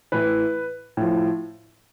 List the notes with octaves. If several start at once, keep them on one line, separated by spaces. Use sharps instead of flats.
A2 E3 B4
A2 F3